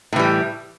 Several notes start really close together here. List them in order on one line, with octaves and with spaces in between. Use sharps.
A2 E3 G3